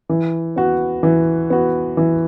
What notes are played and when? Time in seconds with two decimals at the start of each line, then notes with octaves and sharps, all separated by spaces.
0.09 E3
0.56 B3 F#4
1.03 E3
1.50 B3 F#4
1.97 E3